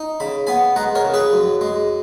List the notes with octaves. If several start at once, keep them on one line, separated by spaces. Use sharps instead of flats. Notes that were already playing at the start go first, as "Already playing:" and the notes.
Already playing: D#4
C#3 B5
B3 G#5 B5
G#3 F#5 A#5
A#4 C#5
C#3
G#4 B4
F#2
G#3